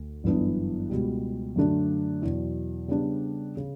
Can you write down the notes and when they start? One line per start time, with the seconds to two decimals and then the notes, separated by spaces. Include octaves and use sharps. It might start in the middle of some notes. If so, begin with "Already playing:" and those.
Already playing: D2
0.24 G1 F#2 E3 B3 D4
0.90 C#2 B2 G3
1.56 F#2 D3 A3 D4 F#4
2.22 E2 B2 F#3
2.88 C#3 G3 B3 D4
3.57 C#3